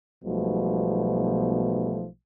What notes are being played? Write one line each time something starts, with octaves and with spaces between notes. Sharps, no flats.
B1 G#2 B2 F3 G3 A3